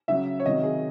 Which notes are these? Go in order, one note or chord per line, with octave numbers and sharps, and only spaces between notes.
C#3 F#3 E5
C#5
C3 D#3 F#3 D#5
G#4